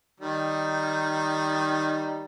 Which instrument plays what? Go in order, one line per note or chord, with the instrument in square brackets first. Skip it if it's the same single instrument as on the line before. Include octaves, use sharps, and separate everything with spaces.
[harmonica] D#3 G3 D#4